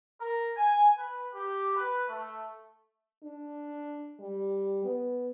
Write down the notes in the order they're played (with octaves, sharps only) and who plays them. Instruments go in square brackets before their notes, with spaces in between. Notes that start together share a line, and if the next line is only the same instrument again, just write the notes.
[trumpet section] A#4
G#5
B4
G4
B4
A3
[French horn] D4
G3
B3